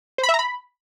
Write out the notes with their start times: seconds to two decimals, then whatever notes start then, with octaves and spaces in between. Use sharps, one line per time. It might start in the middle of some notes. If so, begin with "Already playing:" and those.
0.18 C5
0.23 B5
0.29 E5
0.34 A#5
0.39 B5